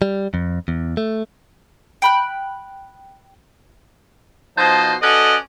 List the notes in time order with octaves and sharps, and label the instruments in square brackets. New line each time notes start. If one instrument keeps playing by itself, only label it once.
[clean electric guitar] G3
F2
E2
A3
[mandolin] G5 B5 F#6
[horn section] B2 F3 D#4 C5 D#5 A5
C#4 F#4 A4 B4 D5 D#5